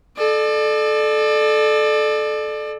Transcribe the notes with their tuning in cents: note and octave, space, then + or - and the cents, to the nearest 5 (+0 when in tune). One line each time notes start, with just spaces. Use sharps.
A4 -20 D5 +30